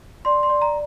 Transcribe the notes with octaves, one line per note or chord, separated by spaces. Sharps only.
D5 C6
C6
D5
A#5